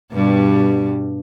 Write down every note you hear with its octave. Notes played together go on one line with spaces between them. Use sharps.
G2 B2 G3